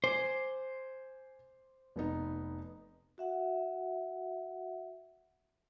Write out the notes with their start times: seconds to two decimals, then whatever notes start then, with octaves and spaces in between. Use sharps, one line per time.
0.04 C5 G#5 D6
1.96 F1 B3 D#4
3.18 F#4 E5 F#5